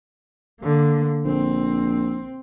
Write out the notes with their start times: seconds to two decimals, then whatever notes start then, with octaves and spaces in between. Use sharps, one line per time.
0.60 D3 A#3
1.25 A#1 C4